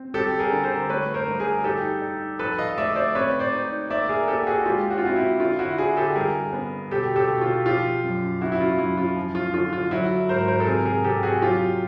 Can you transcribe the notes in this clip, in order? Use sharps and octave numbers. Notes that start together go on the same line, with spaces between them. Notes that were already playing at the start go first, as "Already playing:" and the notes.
Already playing: C4
G3 G4 A4
G#4 A#4
D3
A#4 C5
A3 B4 C#5
A#4 C5
G2
G#4 A#4
D#4 G4 A4
D#4
F3 A4 B4
D#5 F5
A3 D5 E5
C5 D5
C4 B4 C#5
C5 D5
D#4
A#3 D5 E5
G#4 A#4
A#3 G4 A4
F#4 G#4
G#3 F4 G4
F#4
F4
C4 E4 F#4
E4
D3 F4
E4 F#4
D3 F#4 G#4
G4 A4
G2 G#4 A#4
B3
B2 G4 A4
G4 A4
B2
F4
F3 F4 G4
F#2
C#3 E4 F#4
E4
F4
F#2 E4
F4
F3
F4
D3 F4
F4
F#3 E4 F#4
G#2 A#4 C5
A#4 C5
A4
C3 G#4 A#4
G#4 A#4
C3 G4 A4
F#4 G#4
F#3 F4 G4